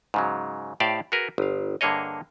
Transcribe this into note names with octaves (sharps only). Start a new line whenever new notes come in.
G#2 C#3 F#3
A2 G4 C5 D5 F5
F#4 G#4 A#4 B4
G1 F5
G2 D3 A#3 G#4 C#5 D#5